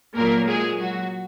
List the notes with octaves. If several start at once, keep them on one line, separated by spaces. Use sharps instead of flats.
A#2 F#3 A#3 A#4
G#3 G#4
F#3 F#4